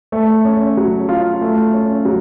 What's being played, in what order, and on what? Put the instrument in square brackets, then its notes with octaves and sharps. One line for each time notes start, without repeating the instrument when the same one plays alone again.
[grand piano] A3
C#4
F#3
F4
A3
C#4
F#3